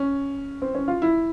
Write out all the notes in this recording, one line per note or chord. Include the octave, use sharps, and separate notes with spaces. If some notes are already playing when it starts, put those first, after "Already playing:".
Already playing: C#4
C4
C#4
F4
E4